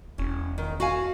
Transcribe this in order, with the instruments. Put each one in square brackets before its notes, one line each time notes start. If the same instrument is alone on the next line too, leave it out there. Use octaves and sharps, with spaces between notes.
[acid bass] E1 [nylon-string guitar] C#4
[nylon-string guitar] D#3
F#4 F5 G#5